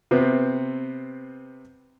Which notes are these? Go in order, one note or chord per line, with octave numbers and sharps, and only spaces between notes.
C3 B3 C4